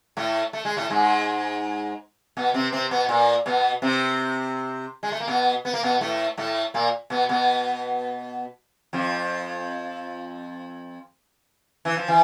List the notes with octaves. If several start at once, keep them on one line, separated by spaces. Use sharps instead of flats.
A2 A3
A3
G#3
A2 A3
G#2 G#3
B2 B3
C3 C4
C3 C4
B2 B3
A#2 A#3
B2 B3
C3 C4
G#3
A3
A#3
B2 B3
B3
A#3
B2 B3
A2 A3
A2 A3
A#2 A#3
B2 B3
B2 B3
F2 F3
E3
F3
E3